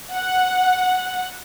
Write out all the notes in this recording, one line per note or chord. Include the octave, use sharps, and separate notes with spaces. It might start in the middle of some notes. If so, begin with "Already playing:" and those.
F#5